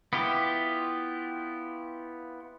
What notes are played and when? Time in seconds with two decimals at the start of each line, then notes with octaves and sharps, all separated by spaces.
0.13 B3 E4 F4 G4